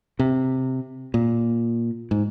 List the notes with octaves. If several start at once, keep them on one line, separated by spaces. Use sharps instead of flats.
C3
A#2
G#2